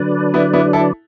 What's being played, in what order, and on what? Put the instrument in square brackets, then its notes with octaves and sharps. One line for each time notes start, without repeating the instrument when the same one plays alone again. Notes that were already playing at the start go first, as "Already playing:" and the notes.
Already playing: [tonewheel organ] D3 F#3 D4 B4 D5
[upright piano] B3 E4
B3 E4
E4 A4